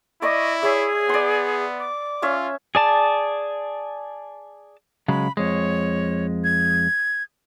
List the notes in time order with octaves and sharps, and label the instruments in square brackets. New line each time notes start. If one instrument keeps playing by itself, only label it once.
[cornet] E4 [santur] D5 C#6 D6 [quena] D#5
[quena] G#4 [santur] C#5 E5
[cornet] B3 [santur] D5 C6
[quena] D6
[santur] C#4 C#5 E5 [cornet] F4
[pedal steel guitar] G#4 D5 A5
[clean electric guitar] C#3 F#3 G#3 [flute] B5
[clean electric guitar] F2 G#3 [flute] C#5
[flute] G#6